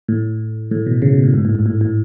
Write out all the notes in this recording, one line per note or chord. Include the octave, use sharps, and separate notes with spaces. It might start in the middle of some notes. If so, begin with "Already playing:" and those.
A2
A2
B2
C#3
B2
A2
G#2
A2
G#2
A2
A2